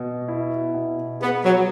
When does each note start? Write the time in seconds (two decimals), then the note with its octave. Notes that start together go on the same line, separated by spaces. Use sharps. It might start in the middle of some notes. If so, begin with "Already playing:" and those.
Already playing: B2
0.28 E4
0.74 B2
1.20 B3 G#4
1.43 F#3